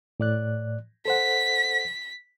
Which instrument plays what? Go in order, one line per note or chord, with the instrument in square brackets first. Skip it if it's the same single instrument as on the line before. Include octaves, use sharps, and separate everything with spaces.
[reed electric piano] A2 D5 F#6
[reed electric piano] A4 C5 F#5 [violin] B6